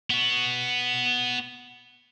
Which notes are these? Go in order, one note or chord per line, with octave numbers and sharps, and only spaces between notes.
B3 F#4